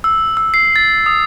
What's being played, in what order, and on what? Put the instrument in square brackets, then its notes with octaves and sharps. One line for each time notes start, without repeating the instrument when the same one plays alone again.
[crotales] E6
E6
C7
A6
D#6